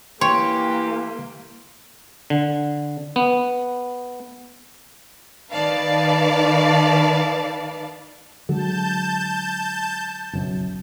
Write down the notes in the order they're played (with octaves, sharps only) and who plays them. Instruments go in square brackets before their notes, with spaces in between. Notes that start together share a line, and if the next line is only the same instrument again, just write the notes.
[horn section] E3 G4 [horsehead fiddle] A#3 [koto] C#5 [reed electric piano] C6
[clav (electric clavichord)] D3
B3
[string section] D#3 B4 D5 F5 A5
[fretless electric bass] D3 F#3 G#3 [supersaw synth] A5 G6
[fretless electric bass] F#1 B1 F#2